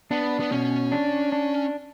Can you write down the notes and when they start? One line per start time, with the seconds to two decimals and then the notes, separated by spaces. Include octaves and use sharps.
0.11 B3 D4
0.40 B3
0.52 B2 C#4
0.92 D4
1.32 D4